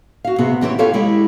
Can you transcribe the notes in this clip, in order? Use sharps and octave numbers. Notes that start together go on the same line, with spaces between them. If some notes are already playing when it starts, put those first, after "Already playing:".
F#4 F5
C3 B3 G#4
E3 C4 G4 C#5
E4 F4 G4 A4 C#5 F5
G#3 E4 G4